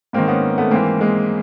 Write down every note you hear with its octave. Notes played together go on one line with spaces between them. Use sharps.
G#2 D#3 A#3 C4
B3 C#4
A3 B3
G#2 E3 A#3 C4
G#3 A#3